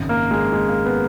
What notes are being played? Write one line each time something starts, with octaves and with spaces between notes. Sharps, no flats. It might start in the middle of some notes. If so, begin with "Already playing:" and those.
Already playing: G#1 F#2 C#3
A#3
G#3
G#3
A#3
B3